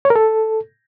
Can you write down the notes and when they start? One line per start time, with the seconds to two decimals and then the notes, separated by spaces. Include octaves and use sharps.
0.05 C#5
0.10 A#4
0.16 A4